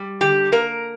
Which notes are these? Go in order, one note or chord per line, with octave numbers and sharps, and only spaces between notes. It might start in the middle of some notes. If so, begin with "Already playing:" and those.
Already playing: G3
D3 G4
A#3 A#4